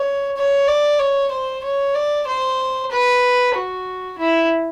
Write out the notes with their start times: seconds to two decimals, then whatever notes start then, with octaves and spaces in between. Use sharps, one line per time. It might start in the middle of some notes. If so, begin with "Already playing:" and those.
Already playing: C#5
0.36 C#5
0.67 D5
0.99 C#5
1.31 C5
1.64 C#5
1.94 D5
2.27 C5
2.91 B4
3.55 F#4
4.18 E4